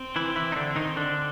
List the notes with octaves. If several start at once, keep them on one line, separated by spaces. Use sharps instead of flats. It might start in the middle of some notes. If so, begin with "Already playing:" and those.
Already playing: C4
E3 E4
E3 E4
D#4
D3 D4
D#3 D#4
D3 D4